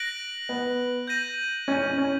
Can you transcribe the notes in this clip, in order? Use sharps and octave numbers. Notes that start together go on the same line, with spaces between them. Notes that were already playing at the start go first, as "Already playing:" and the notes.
Already playing: F#6 A#6 D7 F#7
B3
G6 A#6 D#7 F#7
C#4
C#4
C#4